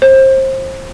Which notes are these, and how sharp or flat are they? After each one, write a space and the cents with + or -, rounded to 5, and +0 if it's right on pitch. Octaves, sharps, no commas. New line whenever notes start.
C5 +25